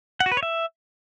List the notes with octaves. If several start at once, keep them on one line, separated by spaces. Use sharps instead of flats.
F#5
F#4
B4
C#5
E5